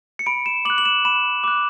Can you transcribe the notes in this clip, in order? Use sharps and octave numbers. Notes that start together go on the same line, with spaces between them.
C#7
B5 D7
E7
D6 F#6 F#7
F#7
E7
B5 E7
D6 F#6